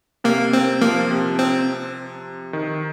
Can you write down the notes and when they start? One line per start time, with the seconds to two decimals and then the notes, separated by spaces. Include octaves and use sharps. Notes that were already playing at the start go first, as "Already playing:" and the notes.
0.24 C3 A#3
0.53 C4
0.81 F3 A#3
1.11 C3
1.39 C4
2.53 D#3